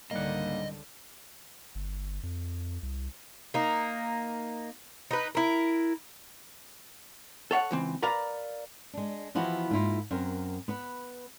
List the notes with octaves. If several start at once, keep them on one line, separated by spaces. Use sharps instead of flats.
C#2 G#2 D3 D#3 G3 A#3 D#5 F#5
G1
F2
C2
A#3 D#4
D#4 B4
E4 A#4
A4 C#5 F5 F#5
C#2 E3 C4
A#4 B4 D5 F5 A#5
G#3 D4
E3 F3 B3 E4 F#4 G4
G#2 A#3 E4 F4
F#2 C4 A#4
B3 B4